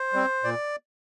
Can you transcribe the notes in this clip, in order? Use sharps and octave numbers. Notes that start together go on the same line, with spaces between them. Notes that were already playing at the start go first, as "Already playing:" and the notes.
Already playing: C5
G3 C4
A#2 D5